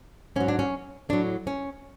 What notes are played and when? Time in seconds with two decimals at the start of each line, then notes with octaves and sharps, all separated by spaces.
0.36 G#2 F#3 C#4
0.48 D4
0.59 C#4
1.09 A2 F#3 D4
1.47 C#4